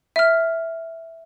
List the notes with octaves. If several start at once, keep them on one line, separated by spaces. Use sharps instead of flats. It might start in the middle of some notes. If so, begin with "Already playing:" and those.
E5 F6